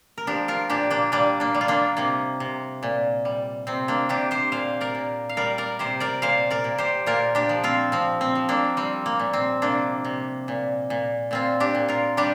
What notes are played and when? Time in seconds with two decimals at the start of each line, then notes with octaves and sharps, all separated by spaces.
0.18 A#4
0.27 F3 D4 G4
0.48 F4 A#4
0.69 A#2 D4 G4
0.90 A#3 D4
1.12 G3 A#3 D4
1.40 A#3 D4
1.54 G3
1.61 F4
1.68 A#3 D4
1.97 C3 A#3
2.40 C3
2.83 A#2
3.25 G3
3.67 C3 C4
3.88 A#3 D4
4.09 C3 D4 G4
4.31 G4 C5
4.52 A#2 C5 F5
4.81 A#4 D5
4.95 A#2
5.29 F5
5.37 G3 A#4 D5
5.58 A#4 D5
5.79 C3 G4 C5
6.00 A#4 D5
6.22 A#2 C5 F5
6.50 A#4 D5
6.64 A#2
6.78 G4 C5
7.06 A#2 F4 A#4
7.35 D4 G4
7.49 F3
7.64 C4 F4
7.92 F3 C4
8.21 C4
8.35 F3
8.49 A#3 D4
8.77 G3 C4
9.06 A#3
9.19 A#2
9.33 C4
9.62 C3 A#3 D4
10.05 C3
10.48 A#2
10.90 A#2
11.31 A#2 C4 F4
11.60 D4 G4
11.75 A#2
11.88 F4 A#4
12.17 G3 D4 G4